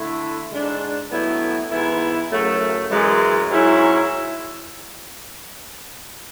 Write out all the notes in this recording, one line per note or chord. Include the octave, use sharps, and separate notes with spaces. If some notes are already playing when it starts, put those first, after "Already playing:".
Already playing: D3 A3 E4
G#2 G#3 D4
A2 F#3 B3 E4
G#2 E3 B3 E4
F#2 C#3 F#3 A3
F#2 E3 G#3
G#2 F#3 C#4 E4